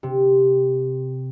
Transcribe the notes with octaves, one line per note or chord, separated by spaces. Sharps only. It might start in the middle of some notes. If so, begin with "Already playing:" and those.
C3